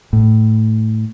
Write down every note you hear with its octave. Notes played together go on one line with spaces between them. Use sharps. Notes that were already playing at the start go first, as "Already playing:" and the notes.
A2